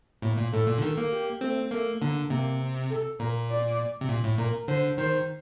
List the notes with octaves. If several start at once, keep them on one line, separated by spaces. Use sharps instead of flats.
A2 A#3
A#2
A2 A4
A#2
D3
D#3 A4
A#3
G4
A3 C4
A3 A#3
D3 A#3
C3 A#3
C4
A4
A#2 A#4
D5
C3
A#2
A2
A#2 A#4
D3 C5
D#3 C5